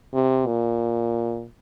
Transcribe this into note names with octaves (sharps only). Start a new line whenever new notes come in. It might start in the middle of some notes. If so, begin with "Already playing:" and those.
C3
A#2